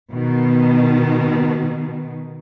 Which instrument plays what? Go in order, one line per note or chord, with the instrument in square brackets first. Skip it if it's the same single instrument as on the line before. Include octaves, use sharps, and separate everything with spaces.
[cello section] B2 D#3